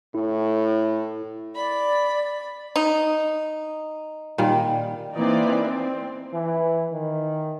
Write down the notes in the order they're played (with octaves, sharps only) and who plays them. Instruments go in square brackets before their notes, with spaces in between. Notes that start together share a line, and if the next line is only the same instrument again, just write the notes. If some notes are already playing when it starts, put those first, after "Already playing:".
[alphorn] A2 [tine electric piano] E4
[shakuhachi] D5 [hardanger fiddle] B5
[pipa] D#4
[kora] A#2 D#3 G3
[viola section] E3 A#3 C4 D#4 D5
C4
[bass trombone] E3
D#3